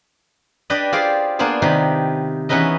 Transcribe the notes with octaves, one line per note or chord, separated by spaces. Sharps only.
D4 G4 B4 D5 D#5
F4 G4 G#4 C5 D5 F5
A#3 B3 D4 G#4 C5
C3 D#3 D#4 G4 B4
E3 B3 C#4 D#4 B4 D#5